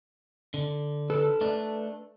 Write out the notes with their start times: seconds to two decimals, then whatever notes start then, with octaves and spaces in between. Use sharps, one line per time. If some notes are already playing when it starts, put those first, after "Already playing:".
0.54 D3
1.10 A4 B4
1.41 A3 D4